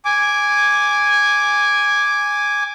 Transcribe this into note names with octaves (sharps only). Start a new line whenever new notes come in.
G#5 D6